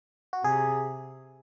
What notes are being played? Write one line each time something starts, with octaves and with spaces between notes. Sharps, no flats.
F#4
C3 G#4